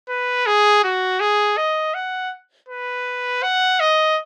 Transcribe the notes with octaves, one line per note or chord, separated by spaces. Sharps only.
B4
G#4
F#4
G#4
D#5
F#5
B4
F#5
D#5